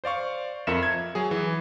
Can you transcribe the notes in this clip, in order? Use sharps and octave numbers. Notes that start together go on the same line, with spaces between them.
C5 D5 F5 C#6
F2 F4 A#4 E5 C#7 E7
G#6
F#3 G#4
E3